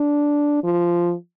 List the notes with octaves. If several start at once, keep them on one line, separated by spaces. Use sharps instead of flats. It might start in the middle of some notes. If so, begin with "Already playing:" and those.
Already playing: D4
F3